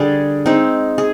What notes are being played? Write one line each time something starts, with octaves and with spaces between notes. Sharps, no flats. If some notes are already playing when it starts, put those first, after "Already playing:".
Already playing: D3 G3 D4 G#4
G#3 C4 D#4
G#4